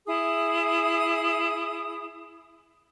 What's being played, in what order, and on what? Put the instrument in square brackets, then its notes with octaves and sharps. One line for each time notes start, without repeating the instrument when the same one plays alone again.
[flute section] E4 G#4 D#6